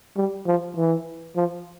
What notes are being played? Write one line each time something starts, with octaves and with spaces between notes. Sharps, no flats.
G3
F3
E3
F3